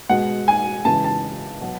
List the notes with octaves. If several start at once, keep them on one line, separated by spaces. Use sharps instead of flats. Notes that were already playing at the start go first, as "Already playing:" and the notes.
B2 G#3 F#5
G#5
C#3 E3 G#3 A5
A5
B2 F#3